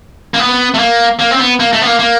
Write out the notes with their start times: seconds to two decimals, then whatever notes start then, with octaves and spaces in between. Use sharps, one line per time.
0.34 A#3
0.39 B3
0.74 A3
0.79 A#3
1.19 A#3
1.31 C4
1.39 B3
1.60 A#3
1.73 A3
1.81 B3
1.86 A#3
1.99 A#3